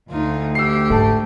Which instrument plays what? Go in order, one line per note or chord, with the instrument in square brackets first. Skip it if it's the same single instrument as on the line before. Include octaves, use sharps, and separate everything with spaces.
[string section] D2 [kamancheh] D#4 F4
[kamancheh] G4 [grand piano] E6 C7
[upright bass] G#2 [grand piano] A3 A5